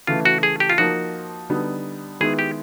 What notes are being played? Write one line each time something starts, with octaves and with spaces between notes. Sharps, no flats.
C#3 E3 A3 F4
F#4
G#4
G4
F4
F3 A#3 D#4 F#4
D3 G3 B3 D#4
D#3 G#3 B3 E4 G#4
G4